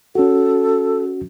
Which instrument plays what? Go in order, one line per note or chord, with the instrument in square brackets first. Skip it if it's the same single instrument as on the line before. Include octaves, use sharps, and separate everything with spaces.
[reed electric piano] C#4 F#4 [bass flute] A4